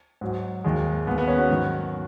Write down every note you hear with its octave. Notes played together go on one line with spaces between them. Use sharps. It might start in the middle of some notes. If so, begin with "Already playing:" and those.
G#2 F#3
D#2 D#3 G#3
D#2 D#3 G#3 B3
B3
C#4
F#4
G#2 D#3 F#3